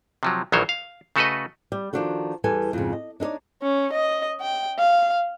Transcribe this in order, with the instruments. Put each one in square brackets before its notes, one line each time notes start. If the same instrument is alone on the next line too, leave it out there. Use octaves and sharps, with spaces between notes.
[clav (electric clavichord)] C3 F3 F#3
A#1 D#3 E3 F#3 C5 C#5
F5
C#3 A3 F#4 A4 B4 D#5
[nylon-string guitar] G3
D#3 F3 D4 F4 F#4 A4
E2 G3 A4 B4 G#5
F2 G#2 C#3
D#5
D4 D#4 A4 C#5 D5
[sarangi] C#4
D#5
G5
F5